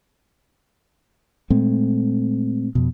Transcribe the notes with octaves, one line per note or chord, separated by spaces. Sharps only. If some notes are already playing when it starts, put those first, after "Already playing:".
A#2 G#3 A3 C4
F2 B2